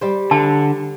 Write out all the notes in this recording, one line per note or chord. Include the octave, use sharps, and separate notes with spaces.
G3 G4 C5
D3 A5